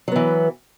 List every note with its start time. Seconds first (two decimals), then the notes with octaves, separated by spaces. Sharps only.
0.08 F#3
0.12 B3
0.16 E3